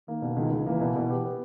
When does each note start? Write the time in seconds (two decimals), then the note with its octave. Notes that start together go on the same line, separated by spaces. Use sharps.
0.08 D#3 A#3
0.22 B2
0.36 C#2 D#3
0.51 C#2
0.66 E3 A#3
0.81 B2
0.96 B2
1.10 G4
1.24 B3